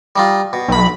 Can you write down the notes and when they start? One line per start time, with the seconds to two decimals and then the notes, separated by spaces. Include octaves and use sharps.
0.16 G3 D#4 F4
0.53 B2
0.68 B1 B5